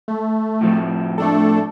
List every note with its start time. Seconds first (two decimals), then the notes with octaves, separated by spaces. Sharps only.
0.08 A3
0.61 A2 F3 C4
1.18 A3 D4 A4